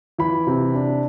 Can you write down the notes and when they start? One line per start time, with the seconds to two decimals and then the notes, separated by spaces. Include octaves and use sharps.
0.18 E3 B5
0.47 C3
0.74 D4